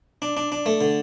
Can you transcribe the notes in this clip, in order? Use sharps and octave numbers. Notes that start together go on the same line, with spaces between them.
D4
D4
D4
A3
D3